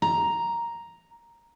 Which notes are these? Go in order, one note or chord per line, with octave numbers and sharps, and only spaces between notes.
A#5